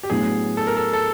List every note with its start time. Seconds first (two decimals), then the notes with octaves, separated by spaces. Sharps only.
0.03 G4
0.10 A2 F#3 B3 D4 G#4
0.57 A4
0.67 A#4
0.77 A4
0.93 A4